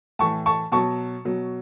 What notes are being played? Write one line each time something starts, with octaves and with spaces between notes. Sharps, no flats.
A2 E3 A5 C#6
A5 C#6
B2 F#3 A5 C#6
B2 F#3